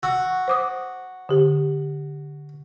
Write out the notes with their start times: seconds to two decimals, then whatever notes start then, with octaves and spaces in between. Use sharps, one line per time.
0.03 F#4 E6
0.48 C5 D6 D#6
1.29 D3 G4